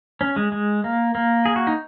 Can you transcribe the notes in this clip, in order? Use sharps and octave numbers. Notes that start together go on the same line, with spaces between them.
C#4
G#3
G#3
A#3
A#3
G#4
F#4
D#4